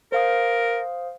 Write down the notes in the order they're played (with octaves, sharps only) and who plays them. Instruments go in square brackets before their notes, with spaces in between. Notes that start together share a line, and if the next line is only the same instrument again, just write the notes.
[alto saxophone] A#4 [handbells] C5 F5 D#6